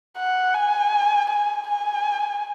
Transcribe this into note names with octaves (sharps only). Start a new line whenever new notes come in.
F#5
G#5
G#5
G#5